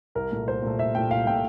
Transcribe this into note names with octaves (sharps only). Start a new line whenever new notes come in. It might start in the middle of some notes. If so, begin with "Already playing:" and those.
C2 A#4
A#2 A3
C2 C5
A#2 A3
C2 E5
A#2 A3 G5
C2 F5
A#2 A3 G5